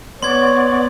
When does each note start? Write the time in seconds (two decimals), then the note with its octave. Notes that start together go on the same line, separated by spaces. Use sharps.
0.23 B3 C#5 D5 C6 G#6